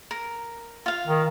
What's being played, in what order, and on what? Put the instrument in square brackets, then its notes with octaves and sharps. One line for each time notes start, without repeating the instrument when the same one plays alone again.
[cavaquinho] A#4
F4 F5
[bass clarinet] D#3